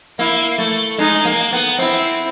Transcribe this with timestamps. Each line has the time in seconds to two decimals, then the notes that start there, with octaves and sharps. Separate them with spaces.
0.19 A#3 E4
0.58 A3
0.98 G#3 D#4
1.25 A#3
1.53 B3
1.79 C4 E4